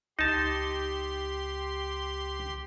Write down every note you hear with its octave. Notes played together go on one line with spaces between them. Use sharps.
C#2 D#4 G4 A5 C6